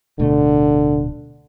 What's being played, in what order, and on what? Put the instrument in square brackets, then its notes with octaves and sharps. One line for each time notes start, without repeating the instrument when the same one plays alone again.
[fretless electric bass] D1 B2 A3 [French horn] D3